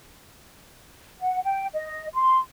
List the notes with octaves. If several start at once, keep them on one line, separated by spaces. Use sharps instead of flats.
F#5
G5
D#5
C6